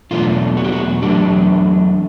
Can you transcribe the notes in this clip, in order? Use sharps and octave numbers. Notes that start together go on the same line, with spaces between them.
E2 B2 F#3 A3 D4 F4
F#4
G4
F#4
E2 B2 F#3 A3 D4 G4